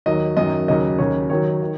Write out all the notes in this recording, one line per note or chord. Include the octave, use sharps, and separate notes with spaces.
D#2 D#3 F#3 D#5
F#2 D#3 F#3 D#5
D#2 C#3 F#3 D#5
D#2 C#3 F#3 C#5
D#2 D#3 F#3 C#5
D#3